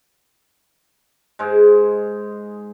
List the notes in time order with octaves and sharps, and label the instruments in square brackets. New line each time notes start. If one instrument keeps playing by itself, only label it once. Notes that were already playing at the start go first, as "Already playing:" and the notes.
[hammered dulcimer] G#2 G#3